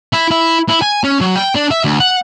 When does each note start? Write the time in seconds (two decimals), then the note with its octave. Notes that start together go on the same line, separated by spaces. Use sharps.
0.13 E4
0.31 E4
0.69 E4
0.82 G#5
1.04 C#4
1.21 F#3
1.36 G5
1.55 D4
1.71 E5
1.84 D2
2.00 F#5